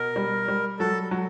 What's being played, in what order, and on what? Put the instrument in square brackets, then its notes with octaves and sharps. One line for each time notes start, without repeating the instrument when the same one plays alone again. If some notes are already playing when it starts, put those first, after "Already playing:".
Already playing: [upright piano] B2 [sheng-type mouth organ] A#4
[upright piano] G3
G3
[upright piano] F#3 [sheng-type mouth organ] A4
[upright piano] F#3